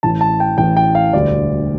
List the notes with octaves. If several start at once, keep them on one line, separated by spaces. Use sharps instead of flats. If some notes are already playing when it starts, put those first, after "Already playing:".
A1 A2 E3 A5
A5
G5
A1 A2 E3 G5
G5
F5
E1 D2 D3 G3 D5